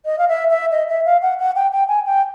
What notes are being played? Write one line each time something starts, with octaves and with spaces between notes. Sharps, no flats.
D#5
F5
E5
E5
D#5
E5
F5
F#5
F#5
G5
G5
G#5
G5